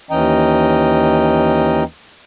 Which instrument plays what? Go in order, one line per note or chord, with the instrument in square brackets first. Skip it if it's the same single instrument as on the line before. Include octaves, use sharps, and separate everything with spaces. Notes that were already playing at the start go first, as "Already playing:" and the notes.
[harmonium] D#2 E3 C#4 D#5 G5 A#5